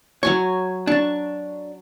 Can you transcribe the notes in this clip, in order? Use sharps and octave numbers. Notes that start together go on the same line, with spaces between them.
F#3 C#5 G#5 C#6
D4 A5 C#6